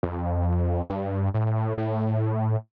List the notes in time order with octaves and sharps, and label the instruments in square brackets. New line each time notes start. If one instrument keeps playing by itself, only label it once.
[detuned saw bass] F2
G2
A2
A2